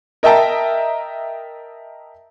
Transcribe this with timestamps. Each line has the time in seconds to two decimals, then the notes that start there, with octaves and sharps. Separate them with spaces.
0.23 A#4 D#5 E5 G5 A5 A#5